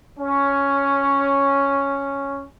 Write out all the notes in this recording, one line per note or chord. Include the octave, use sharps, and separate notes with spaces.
C#4